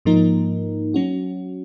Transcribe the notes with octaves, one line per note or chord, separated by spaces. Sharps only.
G#2 F3 A#3 D#4 A#4
F#3 C#4 F#4